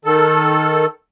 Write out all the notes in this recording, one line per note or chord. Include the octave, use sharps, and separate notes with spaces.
D#3 A4